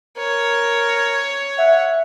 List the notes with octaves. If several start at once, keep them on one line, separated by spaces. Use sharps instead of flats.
A#4 C#5
E5 F#5